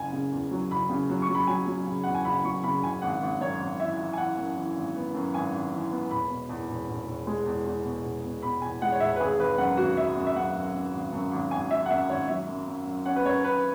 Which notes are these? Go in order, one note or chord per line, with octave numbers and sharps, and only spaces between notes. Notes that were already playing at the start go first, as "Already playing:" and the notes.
Already playing: F#1 G#5
C#3
E2
F#3
F#1 B5
C#3
F#3
C#6
F#3
B5
F#3 G#5
F#3
C#3
E2 F#5
G#5
F#1 B5
F#3 C#6
C#3 B5
F#1 G#5
G#1 F#5
G#1
F#2 C#5
G#1
E3 E5
E3
G#5
E3 F#5
F#2
E3
G#1
B3
F#2
G#1 G#5
G#1
E3
B3
E1 B5
B2
E2
E1
E1
E1
G#3
E2
E2
B2
E1
B2
B2 B5
E2 G#5
G#3 F#5
C#5
E1 E5
B4
G#1 G#4
G#1 B4
F#2 F#5
G#1 F#4
F#3 E5
F#2
E5
F#2 F#5
F#2
F#2
G#1
F#2
G#1
G#1 G#5
F#3 E5
F#5
F#2 E5
G#1 C#5
F#3 E5
F#2
F#2
F#2
C#4 F#5
B4
F#2 C#5
C#4 B4